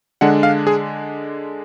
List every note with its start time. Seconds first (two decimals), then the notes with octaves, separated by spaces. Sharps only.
0.21 D3 G#3 D4 F#5
0.43 F5
0.67 G#4